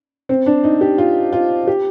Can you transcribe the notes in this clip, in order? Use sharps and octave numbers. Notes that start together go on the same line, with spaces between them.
C4
D4
D#4
G4
F4
F4
G4